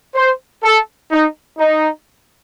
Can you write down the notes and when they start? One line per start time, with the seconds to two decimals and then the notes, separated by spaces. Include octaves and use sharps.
0.15 C5
0.63 A4
1.11 D#4
1.58 D#4